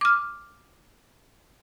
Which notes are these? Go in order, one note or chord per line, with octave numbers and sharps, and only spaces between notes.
D6 F6